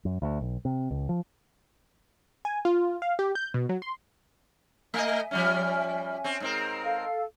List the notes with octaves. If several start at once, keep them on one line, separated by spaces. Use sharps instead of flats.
F#2
D2
B1
C3
C#2
F3
G#5
F4
F5
G4
G6
B2
F#3
C6
A3 D#5 E5 G#5
F3 G3 C#4
C4 C#4
G#2 C4 A#4
A4 F5